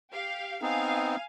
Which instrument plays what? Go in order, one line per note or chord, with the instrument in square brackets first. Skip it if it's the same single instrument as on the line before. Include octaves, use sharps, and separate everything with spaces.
[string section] G4 F5
[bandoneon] B3 C4 D#4 [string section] F5 G#5